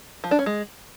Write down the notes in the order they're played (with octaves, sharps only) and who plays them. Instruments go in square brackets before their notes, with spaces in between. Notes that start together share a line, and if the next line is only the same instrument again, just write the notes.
[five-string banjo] F3
D4
C#4
G#3